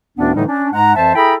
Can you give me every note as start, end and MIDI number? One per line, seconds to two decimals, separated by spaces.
0.17 0.34 38
0.17 0.34 45
0.17 0.34 51
0.17 0.34 59
0.17 0.34 61
0.17 0.34 62
0.35 0.46 45
0.35 0.46 50
0.35 0.46 52
0.35 0.46 55
0.35 0.46 57
0.35 0.46 63
0.48 0.69 61
0.48 0.69 62
0.73 0.95 44
0.73 0.95 56
0.73 0.95 78
0.73 0.95 82
0.95 1.15 41
0.95 1.15 52
0.95 1.15 72
0.95 1.15 76
0.95 1.15 81
1.16 1.34 64
1.16 1.34 68
1.16 1.34 69
1.16 1.34 79
1.16 1.34 82
1.16 1.34 83